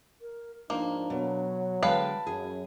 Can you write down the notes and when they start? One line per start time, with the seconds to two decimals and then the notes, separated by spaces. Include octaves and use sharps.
0.21 A#4
0.70 G#2 F3 A#3 D4 D#4 C5
1.10 B2 F#3
1.83 D3 G#3 B4 F5 G5 A5
2.27 F#2 G#4